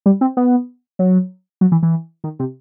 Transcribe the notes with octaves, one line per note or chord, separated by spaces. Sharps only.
G3
C4
B3
F#3
F#3
E3
E3
D#3
C3